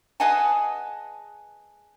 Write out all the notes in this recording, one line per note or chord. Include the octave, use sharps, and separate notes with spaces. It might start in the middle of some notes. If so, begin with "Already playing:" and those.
G#4 B4 D#5 F#5 G#5 A5